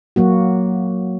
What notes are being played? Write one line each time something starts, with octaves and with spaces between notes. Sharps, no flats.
F#3 A#3 F#4